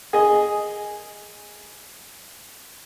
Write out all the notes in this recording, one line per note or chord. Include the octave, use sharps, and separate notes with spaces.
G#4 D#5